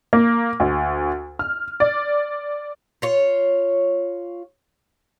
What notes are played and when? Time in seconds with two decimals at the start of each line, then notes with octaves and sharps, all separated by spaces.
0.13 A#3
0.60 D2
1.39 F6
1.80 D5
3.02 F4 C#5